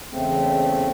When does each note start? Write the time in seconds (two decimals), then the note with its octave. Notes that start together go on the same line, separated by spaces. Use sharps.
0.11 E2 C#3 A3 C4